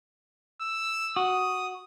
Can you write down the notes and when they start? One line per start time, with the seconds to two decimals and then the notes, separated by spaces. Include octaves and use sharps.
0.61 E6
1.16 F#4 D#6